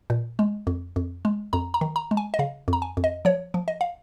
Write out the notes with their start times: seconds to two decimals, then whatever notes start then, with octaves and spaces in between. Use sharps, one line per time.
0.10 A#2
0.39 G#3
0.67 F2
0.96 F2
1.25 G#3
1.53 F2 A#5
1.74 A#5
1.81 D#3
1.96 A#5
2.11 G#3
2.17 G#5
2.34 D#5
2.39 C#3 F5
2.68 F2
2.73 A#5
2.82 G#5
2.97 F2
3.04 D#5
3.25 F3 C#5
3.54 F3
3.68 D#5
3.81 F5